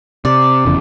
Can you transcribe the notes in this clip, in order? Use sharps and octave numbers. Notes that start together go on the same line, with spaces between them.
C3 D5
F1 E2 C#3